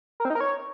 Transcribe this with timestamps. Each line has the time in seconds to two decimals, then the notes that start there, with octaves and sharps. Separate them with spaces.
0.20 A#4
0.25 C4
0.30 D#4
0.35 A#4
0.40 C#5